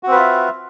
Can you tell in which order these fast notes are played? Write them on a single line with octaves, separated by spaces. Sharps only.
F#4 C4 B4 F4 E5